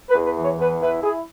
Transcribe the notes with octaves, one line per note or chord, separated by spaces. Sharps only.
B4
E2
B4
E3
C#5
E2 B4
E4 B4
E4 G#4